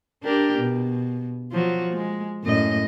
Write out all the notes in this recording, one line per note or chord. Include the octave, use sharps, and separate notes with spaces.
D4 G4 A#4
B2
F3 F#3 F#4
G#3
F#2 A2 D#5